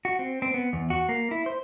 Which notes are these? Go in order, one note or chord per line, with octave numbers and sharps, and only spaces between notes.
F#4
C4
C4
B3
E2
F#4
A#3
E4
C5